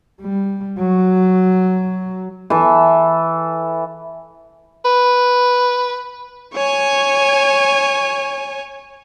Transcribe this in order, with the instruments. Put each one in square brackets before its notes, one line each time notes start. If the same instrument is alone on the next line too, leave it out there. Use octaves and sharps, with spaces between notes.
[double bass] G3
F#3
[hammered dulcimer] E3 A4 E5
[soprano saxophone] B4
[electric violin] C#5 G#5